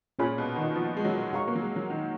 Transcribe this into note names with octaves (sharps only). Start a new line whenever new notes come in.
A#2 C#4 G#4 C#5 G#5 B5
B2
D#3
F3
G#3
F#3
G#3 F#4 C#5 F5 A#5 C#6
A#3
F#3
G#3
F#3
D#3